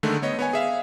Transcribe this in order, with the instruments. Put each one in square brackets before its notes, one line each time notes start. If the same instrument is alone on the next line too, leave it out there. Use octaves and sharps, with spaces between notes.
[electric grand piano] D3 D#3 G#3 A3
B3 C#5 D#5
B3 C#5 G#5
G#4 E5 F5